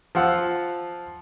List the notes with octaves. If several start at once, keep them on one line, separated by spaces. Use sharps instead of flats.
F3 F4 F#5 E6